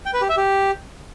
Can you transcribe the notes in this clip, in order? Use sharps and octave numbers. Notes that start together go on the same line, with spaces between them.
G5
B4
G4
E5
G4